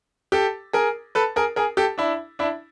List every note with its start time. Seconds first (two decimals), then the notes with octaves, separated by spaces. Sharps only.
0.32 G4 A4
0.73 G#4 A#4
1.15 A4 B4
1.36 G#4 A#4
1.56 G#4 A#4
1.77 G4 A4
1.98 D4 E4
2.39 D4 E4